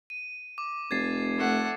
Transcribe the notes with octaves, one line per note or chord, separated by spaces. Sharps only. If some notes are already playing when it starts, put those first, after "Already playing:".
D#7
D6
F1 G#6 A6 C7
A3 F#5